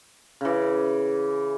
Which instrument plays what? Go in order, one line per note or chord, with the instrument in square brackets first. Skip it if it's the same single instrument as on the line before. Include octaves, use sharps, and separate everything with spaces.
[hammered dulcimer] C#3 E3